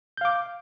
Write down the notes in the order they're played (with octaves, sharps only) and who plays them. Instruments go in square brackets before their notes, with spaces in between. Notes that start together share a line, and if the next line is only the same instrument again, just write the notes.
[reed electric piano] G6
F5
D6